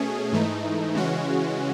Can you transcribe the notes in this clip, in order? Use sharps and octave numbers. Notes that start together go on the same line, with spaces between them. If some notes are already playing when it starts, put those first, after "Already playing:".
Already playing: B2 A3 C#4 G#4
G#2 E3 A3 D#4
C#3 E3 G#3 C#4 F#4